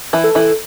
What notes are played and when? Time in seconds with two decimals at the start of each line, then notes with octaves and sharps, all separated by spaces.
0.13 E3 E4
0.24 A4
0.35 E3 E4